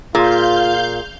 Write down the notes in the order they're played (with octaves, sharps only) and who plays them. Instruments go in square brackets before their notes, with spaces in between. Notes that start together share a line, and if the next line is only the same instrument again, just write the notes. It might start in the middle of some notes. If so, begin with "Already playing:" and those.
[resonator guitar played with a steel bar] A#2 [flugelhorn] F4 [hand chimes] G#4 A#5 [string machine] F5 G6